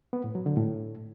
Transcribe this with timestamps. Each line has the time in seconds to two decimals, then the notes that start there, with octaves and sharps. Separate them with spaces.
0.13 B3
0.24 A2
0.35 F#3
0.46 D3
0.57 A2